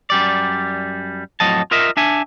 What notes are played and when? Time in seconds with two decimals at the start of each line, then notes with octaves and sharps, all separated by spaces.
0.10 F#2 G3 D5
1.40 F2 A2 F#3 D#5 A5
1.71 F4 A#4 D#5 E5
1.97 D4 E5 G#5